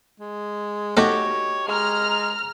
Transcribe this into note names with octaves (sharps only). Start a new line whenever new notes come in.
G#3
A3 D#4 F#4 G4 C#5
G#3 A#5 F6